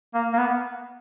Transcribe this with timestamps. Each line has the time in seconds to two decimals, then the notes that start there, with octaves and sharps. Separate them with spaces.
0.14 A#3
0.33 A#3
0.38 B3